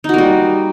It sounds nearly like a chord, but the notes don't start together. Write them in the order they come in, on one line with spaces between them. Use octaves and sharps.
D#4 F#4 A#3 G3